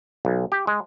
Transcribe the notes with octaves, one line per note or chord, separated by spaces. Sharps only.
B1
G4
G#3